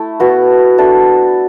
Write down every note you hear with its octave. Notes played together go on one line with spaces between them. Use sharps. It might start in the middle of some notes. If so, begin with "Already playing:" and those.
Already playing: A3 E4
B3 F#4 B4
D4 A4 E5